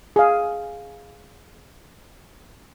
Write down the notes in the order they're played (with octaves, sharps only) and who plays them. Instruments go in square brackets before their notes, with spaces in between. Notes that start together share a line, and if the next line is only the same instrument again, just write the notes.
[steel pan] G#4 F5